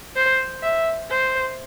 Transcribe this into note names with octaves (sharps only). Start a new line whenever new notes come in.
C5
E5
C5